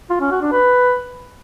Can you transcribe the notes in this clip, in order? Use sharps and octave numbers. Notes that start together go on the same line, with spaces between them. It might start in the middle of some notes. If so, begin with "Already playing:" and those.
F4
C#4
F#4
D4
B4